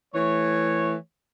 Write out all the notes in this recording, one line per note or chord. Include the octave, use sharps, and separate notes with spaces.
E3 A3 C#5